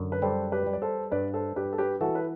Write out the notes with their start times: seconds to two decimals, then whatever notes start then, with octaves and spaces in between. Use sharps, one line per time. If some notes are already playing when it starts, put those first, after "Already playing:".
Already playing: F#2 D3
0.12 B4
0.22 G3 A4 C5
0.52 G4 B4
0.67 G3
0.73 D5
0.82 A4 C5
1.11 G2 B4 D5
1.34 A4 C5
1.56 G2 G4 B4
1.73 A4
1.78 G4 B4
2.01 E3 F#4 A4
2.15 B4